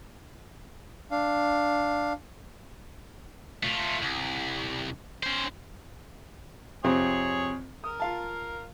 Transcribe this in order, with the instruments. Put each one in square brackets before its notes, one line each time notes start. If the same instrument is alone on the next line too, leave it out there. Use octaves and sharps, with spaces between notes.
[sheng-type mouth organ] D4 F5
[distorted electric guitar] A3 F4
C2
C#4 C5
[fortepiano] F2 C3 C4 [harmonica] G#4 C#5
[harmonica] A#4 [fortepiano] D#6
[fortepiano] F4 F5 A5